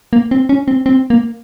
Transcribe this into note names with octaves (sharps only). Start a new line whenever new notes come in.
A#3
C4
C#4
C4
C4
A#3